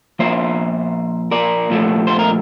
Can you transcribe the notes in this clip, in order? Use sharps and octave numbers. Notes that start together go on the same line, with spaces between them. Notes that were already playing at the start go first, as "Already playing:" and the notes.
A#2 F3 A#3 C5 E5
A#4 D5
A#2 F3 A3
C5
A#4